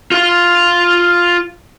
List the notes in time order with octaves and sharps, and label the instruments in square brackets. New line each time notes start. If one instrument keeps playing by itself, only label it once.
[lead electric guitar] F4 F5